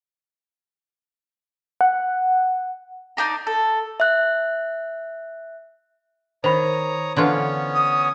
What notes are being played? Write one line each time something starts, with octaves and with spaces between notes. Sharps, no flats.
F#5
D4 D#4 G4 A#5
A4
E5 F#6
D#3 C5 C#5 A#5 B5 D#6
D3 E3 B3 C#4 F4 C#5
D#6